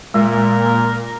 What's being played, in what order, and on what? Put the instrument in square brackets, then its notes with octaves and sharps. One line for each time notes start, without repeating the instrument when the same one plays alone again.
[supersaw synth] A#2 [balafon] G#3 [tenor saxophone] A#4